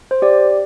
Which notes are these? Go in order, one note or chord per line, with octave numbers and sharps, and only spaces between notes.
C5
G4 D5